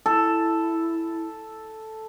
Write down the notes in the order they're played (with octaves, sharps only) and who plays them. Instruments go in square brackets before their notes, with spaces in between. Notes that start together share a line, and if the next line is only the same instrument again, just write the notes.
[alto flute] E4 [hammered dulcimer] A4